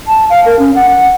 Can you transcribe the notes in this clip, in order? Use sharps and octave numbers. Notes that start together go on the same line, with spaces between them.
A5
F5
A#4
C#4
F#5
F#5